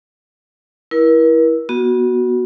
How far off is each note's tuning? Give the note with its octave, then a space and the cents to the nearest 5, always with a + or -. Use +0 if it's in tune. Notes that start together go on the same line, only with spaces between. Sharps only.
E4 +0 A#4 +40
B3 -25 F#4 +0